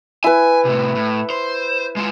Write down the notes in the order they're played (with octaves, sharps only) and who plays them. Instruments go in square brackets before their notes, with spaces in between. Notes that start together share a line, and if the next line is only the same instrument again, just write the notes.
[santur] E4 B4 [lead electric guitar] G#5
[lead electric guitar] A2 C3
A2
C5
G#3 F4